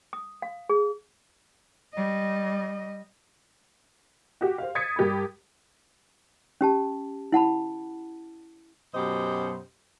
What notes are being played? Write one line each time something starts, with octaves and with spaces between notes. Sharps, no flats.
D#6
F5
G#4
G3 D#5
F#4 G4
C5 F5
D#6 G#6 A6 B6 C#7
G2 G4 A#4 B5
C#4 G4 A5
E4 F#5 A5 B5
F#2 B2 G4 C5 D#5